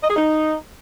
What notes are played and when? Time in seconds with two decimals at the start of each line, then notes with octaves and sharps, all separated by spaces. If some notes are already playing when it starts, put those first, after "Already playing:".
0.01 D#5
0.08 G#4
0.15 D#4